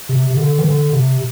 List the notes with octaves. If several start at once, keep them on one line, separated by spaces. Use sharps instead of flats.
C3
C3
D3
E3
D3
C3